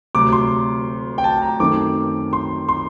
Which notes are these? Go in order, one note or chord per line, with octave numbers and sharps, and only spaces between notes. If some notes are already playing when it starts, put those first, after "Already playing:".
D2 C3 F#3 D6
C6
G5
A5
A#5
F#2 D#3 A3 C4 D6
C6
C6